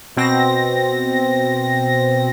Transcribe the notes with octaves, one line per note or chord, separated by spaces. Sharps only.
B2 C4 A#6